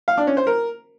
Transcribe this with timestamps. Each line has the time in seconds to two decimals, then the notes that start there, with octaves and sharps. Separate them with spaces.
0.08 F5
0.17 D4
0.27 C#4
0.37 C5
0.47 A#4